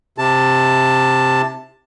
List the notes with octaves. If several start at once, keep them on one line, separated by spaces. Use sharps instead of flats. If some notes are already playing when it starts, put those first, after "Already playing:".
C3 A5